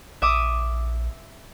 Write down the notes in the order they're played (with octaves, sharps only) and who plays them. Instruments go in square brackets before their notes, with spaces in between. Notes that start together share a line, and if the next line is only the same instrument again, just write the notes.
[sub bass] A#1 [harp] E5 D6 D#6